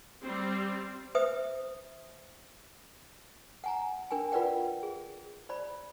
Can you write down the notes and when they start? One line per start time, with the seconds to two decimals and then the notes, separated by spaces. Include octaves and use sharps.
0.23 G3 C4
1.15 B4 C5 E5 D#6
3.64 F#5 G#5 A#5
4.11 D4 A#4 G5 G#5
4.32 F4 A#4 B4 D5 F#5 G5
4.83 G#4
5.49 C5 D5 B5